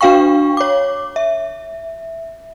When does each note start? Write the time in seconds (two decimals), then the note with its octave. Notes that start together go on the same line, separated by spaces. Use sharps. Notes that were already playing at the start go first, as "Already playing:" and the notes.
0.01 D4 F#4 F5 G5 C#6
0.57 C#5 D6
1.16 E5